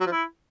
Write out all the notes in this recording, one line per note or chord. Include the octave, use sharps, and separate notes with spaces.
F#3
F3
E4